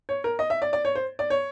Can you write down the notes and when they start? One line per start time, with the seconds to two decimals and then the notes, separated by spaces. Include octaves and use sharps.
0.09 C#5
0.24 A#4
0.39 D#5
0.50 E5
0.62 D5
0.73 D5
0.85 C#5
0.95 C5
1.19 D5
1.30 C#5